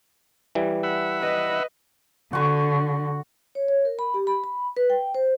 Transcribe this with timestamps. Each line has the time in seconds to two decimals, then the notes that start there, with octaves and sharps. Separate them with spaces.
0.55 E3 G3
0.83 E5 F#5 B5
1.20 B4 D#5
2.33 D3 F#4 C#6
3.55 C#5
3.68 C#5
3.85 A#4
3.99 B5
4.14 G4
4.27 B5
4.44 B5
4.77 B4
4.90 G5
5.15 C5